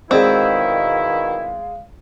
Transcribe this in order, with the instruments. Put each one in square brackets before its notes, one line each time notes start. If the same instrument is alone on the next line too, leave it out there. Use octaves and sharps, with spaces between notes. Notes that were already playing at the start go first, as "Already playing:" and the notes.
[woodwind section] B2 D#3 E4 [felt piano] G#3 G#4 D5 [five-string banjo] C4 [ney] F5